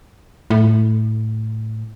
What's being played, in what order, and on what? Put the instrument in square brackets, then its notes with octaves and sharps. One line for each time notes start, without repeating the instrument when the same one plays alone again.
[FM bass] A2